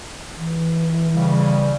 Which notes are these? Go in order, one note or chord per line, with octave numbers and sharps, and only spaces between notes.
E3
C#3 G3